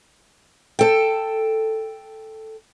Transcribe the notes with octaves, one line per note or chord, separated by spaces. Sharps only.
A4 G5